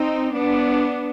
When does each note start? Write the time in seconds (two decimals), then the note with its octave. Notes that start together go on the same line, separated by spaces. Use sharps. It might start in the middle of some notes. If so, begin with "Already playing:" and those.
Already playing: C4 D#4
0.34 B3 D4